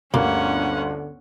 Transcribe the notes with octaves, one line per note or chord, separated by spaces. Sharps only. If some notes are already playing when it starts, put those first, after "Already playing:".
G1 D2 G2 D3 A#3 C#4 F#5